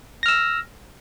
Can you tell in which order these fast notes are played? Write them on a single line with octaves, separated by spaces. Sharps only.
A#6 F6 E6